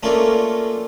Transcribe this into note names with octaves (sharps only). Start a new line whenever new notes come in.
A3 A#3 C#4 D4 F4 A4